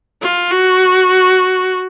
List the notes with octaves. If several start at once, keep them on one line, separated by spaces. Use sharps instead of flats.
F4
F#4